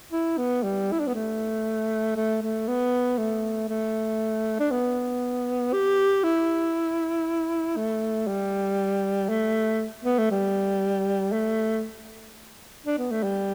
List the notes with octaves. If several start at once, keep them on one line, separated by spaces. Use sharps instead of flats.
E4
B3
G3
E4
D4
B3
A3
A3
A3
B3
A3
A3
D4
B3
G4
E4
A3
G3
A3
B3
A3
G3
A3
D4
B3
A3
G3